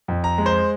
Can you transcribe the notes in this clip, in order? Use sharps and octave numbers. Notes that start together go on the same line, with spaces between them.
F2
A#5
G#3
C5